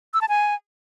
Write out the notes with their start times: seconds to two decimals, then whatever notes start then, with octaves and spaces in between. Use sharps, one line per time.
0.14 E6
0.21 A5
0.29 G#5